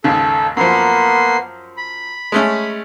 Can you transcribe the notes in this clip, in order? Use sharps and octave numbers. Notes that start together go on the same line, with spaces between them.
D#2 G#2 C#3 A4
F#2 F3 A#3 B3 C6
B5
G#3 A3 C#4